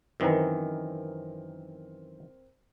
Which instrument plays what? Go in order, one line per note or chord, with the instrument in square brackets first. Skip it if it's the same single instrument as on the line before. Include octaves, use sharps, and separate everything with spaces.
[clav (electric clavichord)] F#2 D#3 E3 [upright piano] C4 A#4